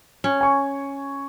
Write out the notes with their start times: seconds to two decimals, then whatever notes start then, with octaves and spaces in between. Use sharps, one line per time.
0.24 C#4
0.41 G#5 C#6